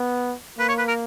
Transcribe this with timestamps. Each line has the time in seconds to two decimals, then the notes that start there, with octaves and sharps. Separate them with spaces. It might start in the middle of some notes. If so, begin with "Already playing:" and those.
Already playing: B3
0.58 A#3 B4
0.68 C#5
0.78 B4
0.88 A#4